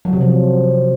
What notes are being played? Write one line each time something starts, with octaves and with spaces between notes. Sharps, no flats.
F#3
C3
F3